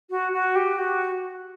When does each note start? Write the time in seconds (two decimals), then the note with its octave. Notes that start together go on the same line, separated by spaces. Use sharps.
0.10 F#4
0.32 F#4
0.55 G4
0.78 F#4